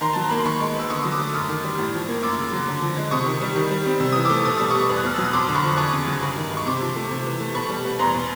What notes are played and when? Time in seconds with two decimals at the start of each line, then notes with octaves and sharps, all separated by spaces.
0.01 D#3 A#5 C6
0.13 F#3 A5
0.21 A#5
0.29 A#3 B5
0.37 C6
0.45 D#3 B5 C#6
0.60 G#3
0.75 B3 E6
0.90 D3 C#6 D#6
1.02 F#3 D#6
1.12 D6 E6
1.19 A3
1.34 F#2 D#6 F6
1.49 D#3
1.64 G3
1.78 A2
1.93 F3
2.08 A#3
2.23 F#2 D6 E6
2.38 C#3
2.52 F#3
2.67 D3
2.82 F3
2.97 G#3
3.11 C3 C#6 D#6
3.26 D#3
3.41 G3
3.56 D#3
3.71 G3
3.86 C4
4.00 C3 E6
4.12 E3 D#6
4.25 D6 E6
4.30 A3
4.44 B2 D#6
4.57 G3 E6
4.70 B3 C#6 D#6
4.89 E2
4.97 F#6
5.04 B2 F6
5.14 F#3 E6
5.24 D#6
5.33 F2 C6 D6
5.48 D3
5.55 B5 C#6
5.63 F3
5.77 E2 C#6 D#6
5.93 C#3
6.07 F#3
6.23 G2
6.36 D#3
6.52 G#3
6.57 C#6
6.66 C3 C6 D6
6.81 F3
6.96 A3
7.11 C3
7.26 E3
7.40 A3
7.55 B2 B5 C#6
7.69 G3
7.84 B3
7.99 E2 A#5 C6
8.14 B2